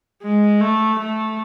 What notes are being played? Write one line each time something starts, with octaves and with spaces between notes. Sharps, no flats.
G#3
A3
A3